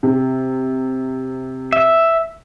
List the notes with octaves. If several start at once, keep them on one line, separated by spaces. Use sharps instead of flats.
C3
E5